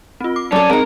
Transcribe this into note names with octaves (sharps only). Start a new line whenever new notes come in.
C4 F4
D6
F#2 C#4 A4 D5 A5
G#3 C4 D#4 A#4